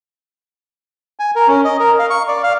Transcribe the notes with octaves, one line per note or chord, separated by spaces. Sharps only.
G#5
A#4
C#4
D#5
A#4
F5
C#6
D5
F5